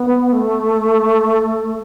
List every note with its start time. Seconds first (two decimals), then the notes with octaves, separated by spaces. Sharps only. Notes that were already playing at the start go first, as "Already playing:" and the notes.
Already playing: B3
0.33 A3